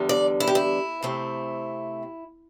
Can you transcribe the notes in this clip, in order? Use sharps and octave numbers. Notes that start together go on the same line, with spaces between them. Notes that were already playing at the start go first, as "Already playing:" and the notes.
Already playing: E2 D3 G3
D5
E4
G4
E4
C3 A3 C4